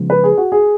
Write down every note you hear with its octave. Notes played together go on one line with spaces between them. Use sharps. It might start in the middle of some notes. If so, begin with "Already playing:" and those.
Already playing: C#3 F3 G#3 B3
B4
G#4
F#4
G#4